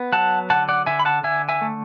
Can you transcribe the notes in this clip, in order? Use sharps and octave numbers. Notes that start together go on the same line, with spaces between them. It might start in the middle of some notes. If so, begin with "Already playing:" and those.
Already playing: B3
F#3 F#5 A5
D3 F#5 A5
D5 F#5
D3 E5 G#5
B5
F#5 A5
D3 E5 G#5
E5 G#5
A3